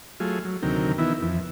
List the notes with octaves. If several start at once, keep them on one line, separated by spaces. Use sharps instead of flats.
F#3 A3 F4 G#4
F#3
D2 C3 D#3 F#3 A#4 G5
D#3 E3 B3 E4
F2 E3